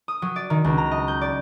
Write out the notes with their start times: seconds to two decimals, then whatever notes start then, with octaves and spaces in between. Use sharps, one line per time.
0.08 D#6
0.22 F#3
0.36 D5
0.50 D#3
0.64 C#2
0.78 A#5
0.91 D#5
1.08 G6
1.21 D5